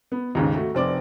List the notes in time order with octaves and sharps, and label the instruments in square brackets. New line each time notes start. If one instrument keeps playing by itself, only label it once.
[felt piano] B3
D#2 G#2 C#3
A3 F#4
F1 C4 D5 D6